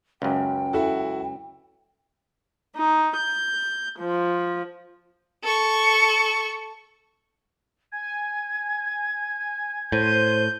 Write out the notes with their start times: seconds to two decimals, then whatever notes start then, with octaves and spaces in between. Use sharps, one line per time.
0.22 C#2 F#2 G5
0.73 E4 F#4 A4
2.75 D#4
3.16 G6
4.00 F3
5.44 A4 C#6
7.92 G#5 G#6
9.92 A2 C5 G6 D#7